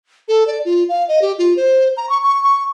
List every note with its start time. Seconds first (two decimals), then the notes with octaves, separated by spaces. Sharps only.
0.28 A4
0.47 D5
0.65 F4
0.89 F5
1.08 D#5
1.22 G4
1.38 F4
1.57 C5
1.97 A#5
2.09 C#6
2.24 C#6
2.44 C#6